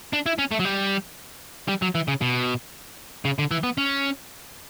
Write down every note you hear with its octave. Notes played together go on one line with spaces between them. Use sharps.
D4
E4
C#4
A3
F#3
G3
G3
F#3
E3
C#3
B2
C#3
D3
E3
B3
C#4